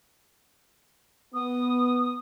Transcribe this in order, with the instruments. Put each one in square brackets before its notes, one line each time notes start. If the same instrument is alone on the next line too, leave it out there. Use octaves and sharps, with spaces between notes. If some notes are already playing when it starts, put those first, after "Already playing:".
[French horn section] B3 [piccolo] D#6